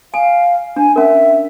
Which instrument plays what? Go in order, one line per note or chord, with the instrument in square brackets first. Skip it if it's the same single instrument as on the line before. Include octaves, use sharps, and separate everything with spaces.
[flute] F5 [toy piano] G#5
[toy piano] D4 [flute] G#5
[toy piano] C#4 A#4 [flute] E5